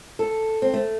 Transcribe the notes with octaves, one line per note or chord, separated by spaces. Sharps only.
A4
C4
A3